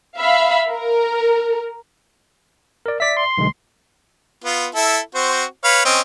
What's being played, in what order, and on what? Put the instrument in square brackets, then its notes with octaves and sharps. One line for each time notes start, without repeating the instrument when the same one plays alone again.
[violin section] E5 F5 B5
A#4
[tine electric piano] A#4 D5
[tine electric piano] D5 E5 [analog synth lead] B6
[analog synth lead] C6
[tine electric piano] B1 D3 G#3
[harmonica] B3 F4
E4 A4
C4 F#4 C5
B4 C#5 F5
C4 C#4 D#5